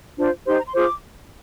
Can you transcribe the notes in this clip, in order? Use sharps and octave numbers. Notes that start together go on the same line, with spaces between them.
D4 F4 C5
D#4 G4 C5 C6
A#5
C6
F4 G#4 C5 D6